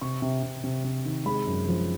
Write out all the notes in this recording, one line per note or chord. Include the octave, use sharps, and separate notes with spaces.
C3 C#6
C3
C3
C3
C3
D#3
G#3 B5
F#2
F3